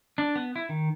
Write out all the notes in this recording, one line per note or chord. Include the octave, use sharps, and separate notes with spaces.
D4
B3
E4
D#3